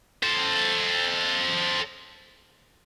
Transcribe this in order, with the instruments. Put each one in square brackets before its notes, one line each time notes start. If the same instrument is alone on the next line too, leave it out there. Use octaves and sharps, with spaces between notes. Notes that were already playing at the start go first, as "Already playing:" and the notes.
[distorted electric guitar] A4 C5